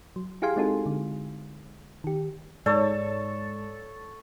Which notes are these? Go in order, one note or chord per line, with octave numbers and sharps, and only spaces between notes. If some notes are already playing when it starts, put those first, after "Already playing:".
F#3
E4 G4 G#4 F5 G#5 C6
G#3 C4 D#4 F#4 A4
D3 G#3
D#3 G4
G#2 A4 C#5 D5